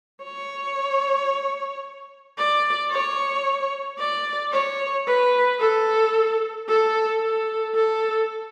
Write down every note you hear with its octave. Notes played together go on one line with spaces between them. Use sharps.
C#5
D5
C#5
D5
C#5
B4
A4
A4
A4
A4